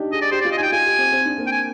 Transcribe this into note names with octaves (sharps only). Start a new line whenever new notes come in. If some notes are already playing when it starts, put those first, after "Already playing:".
Already playing: D4 D#4 G4
G#4 D#5
D5
G4 C5
D5
F4
D#5
D#4 G5 G#5
F4 G#5
G4
C4
C4
D4
A#3
G5
G#5